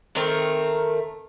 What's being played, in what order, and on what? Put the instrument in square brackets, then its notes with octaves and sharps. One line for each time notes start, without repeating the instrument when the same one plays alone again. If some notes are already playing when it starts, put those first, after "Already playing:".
[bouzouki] D#3 A3 C4 A#4